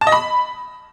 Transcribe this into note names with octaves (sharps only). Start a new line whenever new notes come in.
A5
D#5
B5